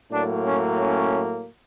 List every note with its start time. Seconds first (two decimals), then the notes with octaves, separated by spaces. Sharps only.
0.11 A2 F#3 A#3 D4
0.45 C#4
0.79 C#4